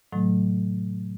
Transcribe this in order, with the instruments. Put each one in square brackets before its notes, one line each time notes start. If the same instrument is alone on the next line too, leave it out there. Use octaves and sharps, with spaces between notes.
[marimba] A2 C3 D#3 F#3 A3